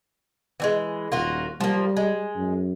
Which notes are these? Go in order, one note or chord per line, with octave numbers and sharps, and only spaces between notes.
E3 G3 G#3
D#1 A#3 F4 F#4
F3 G3 A#3
G#3
F#2